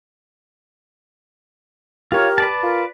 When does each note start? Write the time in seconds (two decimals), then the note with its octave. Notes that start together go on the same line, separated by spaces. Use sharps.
2.12 F4 G4 A#4 C#5
2.38 B4 D5 A5
2.63 F4 A#4